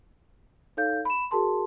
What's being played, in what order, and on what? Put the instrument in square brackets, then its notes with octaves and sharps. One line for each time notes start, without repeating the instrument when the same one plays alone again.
[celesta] D#4 A4 C#5 F5 G6
B5 E7
F#4 G#4 A#4 A5 C6